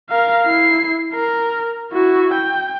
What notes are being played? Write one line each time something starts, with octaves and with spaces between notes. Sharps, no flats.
A#4 F5
E4 C7
A#4
E4 F#4
G5